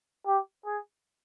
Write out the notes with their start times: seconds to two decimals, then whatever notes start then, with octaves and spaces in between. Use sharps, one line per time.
0.26 G4
0.65 G#4